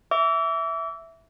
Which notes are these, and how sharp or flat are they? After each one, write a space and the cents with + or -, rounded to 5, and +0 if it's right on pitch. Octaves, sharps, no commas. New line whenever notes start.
E5 +0 D6 -35